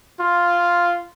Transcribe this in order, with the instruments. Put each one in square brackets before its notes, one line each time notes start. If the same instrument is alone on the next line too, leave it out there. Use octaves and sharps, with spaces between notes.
[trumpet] F4